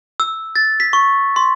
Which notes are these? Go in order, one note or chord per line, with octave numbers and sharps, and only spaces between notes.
E6
A6
B6
C#6
C6